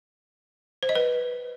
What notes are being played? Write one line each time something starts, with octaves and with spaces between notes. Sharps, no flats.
C5
D#5
B4